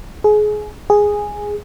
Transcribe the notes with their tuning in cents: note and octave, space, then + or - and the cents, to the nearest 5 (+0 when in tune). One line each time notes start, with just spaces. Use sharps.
G#4 +25
G#4 -5